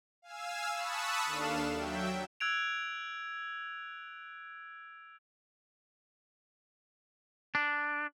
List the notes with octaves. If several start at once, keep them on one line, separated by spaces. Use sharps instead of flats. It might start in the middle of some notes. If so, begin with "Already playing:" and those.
F5 G#5 E6
A5 B5 C#6 D#6 E6 F#6
D#2 D4 A4 F5 E7
F#3 E5 G5
E6 F#6 G#6 D7 F7
D4